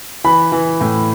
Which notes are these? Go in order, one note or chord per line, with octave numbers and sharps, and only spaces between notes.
E3 B5
E3
A2